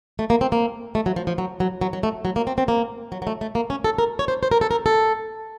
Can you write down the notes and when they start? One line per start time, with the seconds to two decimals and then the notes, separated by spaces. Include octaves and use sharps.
0.19 A3
0.30 A#3
0.41 C4
0.52 A#3
0.95 A3
1.06 F#3
1.16 F3
1.27 F3
1.38 F#3
1.60 F#3
1.81 F#3
1.93 F#3
2.03 A3
2.25 F#3
2.36 A#3
2.47 C4
2.58 C4
2.68 A#3
3.12 F#3
3.22 F#3
3.27 A3
3.41 A3
3.55 A#3
3.70 C#4
3.84 A4
3.98 A#4
4.19 C#5
4.28 C5
4.43 C5
4.51 A#4
4.61 A4
4.71 A#4
4.86 A4